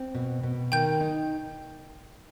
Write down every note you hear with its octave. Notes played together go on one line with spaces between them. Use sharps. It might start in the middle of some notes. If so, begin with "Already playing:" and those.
Already playing: C4
B2
B2
D#3 G5 G6
D#4